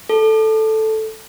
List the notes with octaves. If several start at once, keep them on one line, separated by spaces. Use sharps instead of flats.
A4